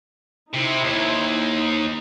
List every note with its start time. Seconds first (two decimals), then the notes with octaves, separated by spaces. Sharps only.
0.54 C3 D#4 E4 C5
0.84 D#2
1.52 D#4